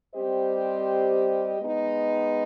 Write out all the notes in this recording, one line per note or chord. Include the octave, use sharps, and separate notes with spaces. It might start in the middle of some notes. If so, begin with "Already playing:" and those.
G3 C4 G4 C5 D#5
G#3 B3 D#4